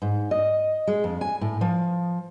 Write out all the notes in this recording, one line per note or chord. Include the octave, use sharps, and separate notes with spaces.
G#2
D#5
G#3
F2
G#5
A2
F3